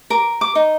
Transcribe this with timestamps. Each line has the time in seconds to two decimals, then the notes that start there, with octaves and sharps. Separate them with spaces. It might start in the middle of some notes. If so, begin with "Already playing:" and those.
0.10 A#4 D6
0.41 D6
0.55 D#4